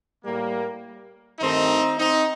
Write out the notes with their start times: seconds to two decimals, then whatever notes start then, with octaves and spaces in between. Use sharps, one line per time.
0.25 A2 G3 A#3
1.39 G2 D#3 A3 C4 D#4
1.97 C4 D#4